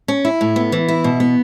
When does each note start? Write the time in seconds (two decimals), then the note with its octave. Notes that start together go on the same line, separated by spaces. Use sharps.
0.08 C#4
0.25 E4
0.41 A2
0.56 B3
0.72 E3
0.88 E4
1.04 B2
1.20 B3